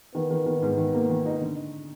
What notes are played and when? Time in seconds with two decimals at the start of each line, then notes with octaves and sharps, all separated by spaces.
0.15 D#3 B3
0.31 D#3
0.46 D#3
0.62 G#2
0.77 D#3
0.94 A#3
1.09 D#3
1.26 D#4
1.41 D3